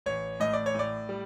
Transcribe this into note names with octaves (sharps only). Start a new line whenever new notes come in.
A1 C#5
A2 D#5
D5
C#5
A2 D5
G3